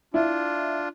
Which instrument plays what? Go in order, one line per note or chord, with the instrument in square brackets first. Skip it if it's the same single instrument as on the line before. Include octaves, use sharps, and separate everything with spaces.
[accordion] D4 F4 [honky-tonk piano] E4